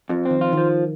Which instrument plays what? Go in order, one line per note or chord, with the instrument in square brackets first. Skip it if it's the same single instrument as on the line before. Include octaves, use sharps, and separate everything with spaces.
[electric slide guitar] F2 [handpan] F3
[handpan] D#3 [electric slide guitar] C4
[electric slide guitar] F4
[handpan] D#3
[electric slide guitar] F3